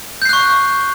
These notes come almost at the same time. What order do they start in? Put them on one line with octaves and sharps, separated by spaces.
G6 C7 F#6 C#6